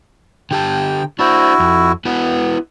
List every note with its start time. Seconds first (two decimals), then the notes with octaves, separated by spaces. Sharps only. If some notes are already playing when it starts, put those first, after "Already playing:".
0.51 D3 G4 G5 A5
1.19 D4 E4 F#4 C5
1.60 F2
2.05 B3 E4 F#4 B4